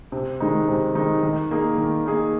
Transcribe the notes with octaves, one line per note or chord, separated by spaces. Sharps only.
C3
D#3 G#3 D#4
C3
D#3 G#3 D#4
D#3
A#3 D#4 G#4
D#3
A#3 D#4 G#4